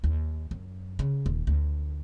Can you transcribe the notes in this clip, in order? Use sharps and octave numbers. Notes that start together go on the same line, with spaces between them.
D#2
F#2
C#3
D#1
D2